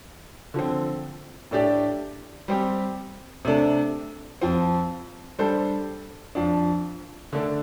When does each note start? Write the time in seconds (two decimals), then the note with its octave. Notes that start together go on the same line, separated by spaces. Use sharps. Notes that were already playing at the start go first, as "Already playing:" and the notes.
0.54 D3 F3 C4
1.51 A2 A3 D4 G4 D5
2.48 G3 C4 G4
3.45 C3 A3 D4 A4
4.41 F2 F3 C4
5.39 G3 D4 A4 C5
6.35 F2 F3 D4
7.33 D3 A3 D4 A4